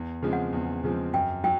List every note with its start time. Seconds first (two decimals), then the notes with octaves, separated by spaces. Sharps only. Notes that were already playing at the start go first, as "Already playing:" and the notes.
Already playing: E2
0.22 C#3 F3 G#3 C4
0.33 F#5
0.53 E2
0.84 C#3 F3 G#3 C4
1.13 F#2 G5
1.44 F#3 G5